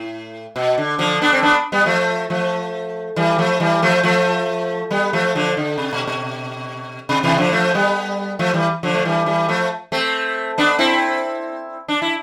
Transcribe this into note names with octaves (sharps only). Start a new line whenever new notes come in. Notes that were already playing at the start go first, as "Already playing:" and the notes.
Already playing: A2
B2
D3
D3 F3
B3 D4
C4
B3 D4
G3 B3
F3 A3
F3 A3
E3 G3
F3 A3
E3 G3
F3 A3
F3 A3
G3 B3
F3 A3
D3 F3
D3
C3
B2
B2
C3
C3 E3
D3 F3
F3 A3
G3 B3
F3 A3
E3 G3
D3 F3
A3
E3 G3
E3 G3
F3 A3
A3 C4
B3 D4
C4 E4
D4
E4